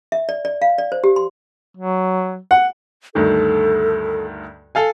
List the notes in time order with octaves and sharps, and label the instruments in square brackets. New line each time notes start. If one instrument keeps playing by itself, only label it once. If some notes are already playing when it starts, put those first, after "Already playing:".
[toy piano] E5
D5
D5
F5
D5
C5
G4
C6
[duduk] F#3
[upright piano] F#5
[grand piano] D2 G2 D#3 [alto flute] A4
[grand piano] A4 F5 G#5